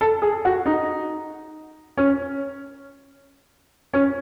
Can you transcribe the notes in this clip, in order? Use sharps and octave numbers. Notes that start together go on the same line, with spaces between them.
A4
G#4
F#4
D#4
C#4
C#4